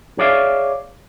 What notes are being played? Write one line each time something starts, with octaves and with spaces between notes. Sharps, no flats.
G#4 C#5 D5 E5 F5